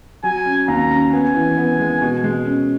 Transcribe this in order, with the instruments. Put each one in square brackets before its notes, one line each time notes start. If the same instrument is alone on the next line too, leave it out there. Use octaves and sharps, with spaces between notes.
[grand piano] F#3 [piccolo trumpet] G#5
[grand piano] C#4
[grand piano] D#2 [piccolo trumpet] A#5
[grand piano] C#4
[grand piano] B3 [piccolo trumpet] G#5
[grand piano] E3
B3
G#3
B2
G#3
C#4